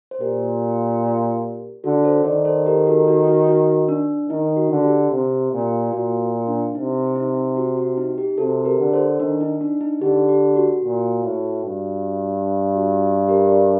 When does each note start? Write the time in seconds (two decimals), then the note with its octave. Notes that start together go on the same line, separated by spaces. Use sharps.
0.11 C5
0.20 A#2 G4 A#4
1.84 D3 F#4 A4
2.04 A4 C5
2.25 D#3 A#4 D5
2.45 A4 C5
2.66 G4 A#4
2.87 F#4 A4
3.08 F#4
3.28 F#4
3.47 F#4
3.89 D4
4.29 D#3 D#4
4.57 F#4
4.70 D3
4.84 G4
5.11 C3
5.53 A#2
5.93 A#2 F#4
6.47 D4
6.75 C3 D#4
7.16 D#4
7.57 F#4
7.77 F#4
7.97 D#4
8.18 G4
8.38 C3 F#4 A4
8.65 G4 A#4
8.79 D3
8.93 A4 C5
9.20 D#3 D4
9.41 D#4
9.61 D4
9.81 D#4
10.02 D3 G4
10.29 G4
10.56 F#4
10.84 A#2
11.24 A2
11.65 G2
12.75 F#4
13.28 G4 A#4
13.49 A#4 D5